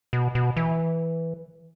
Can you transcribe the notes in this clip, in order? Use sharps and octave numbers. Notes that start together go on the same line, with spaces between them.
B2
B2
E3